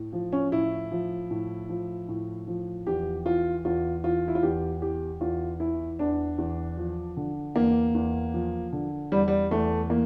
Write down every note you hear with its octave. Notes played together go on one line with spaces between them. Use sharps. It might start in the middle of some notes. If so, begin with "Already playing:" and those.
Already playing: A2
F3
C#4
A2 E4
F3
A2
F3
A2
F3
E2 G4
E3 F4
E2 F4
E3 F4
E4
F4
E2 G4
E3 G4
E2 F4
E3 E4
E2 D4
E2
F3
D3
E2 A#3
E2
F3
D3
E2 G3
G3
E2 A3
E3 A#3